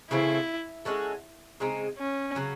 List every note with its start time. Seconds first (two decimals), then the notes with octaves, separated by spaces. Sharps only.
0.11 C#3 E3 A3 C4 E4
0.85 G#3 C#4 F#4 A4
1.60 C#3 G#3 C4 D#4
1.98 C#4
2.35 C#3 F#3 C#4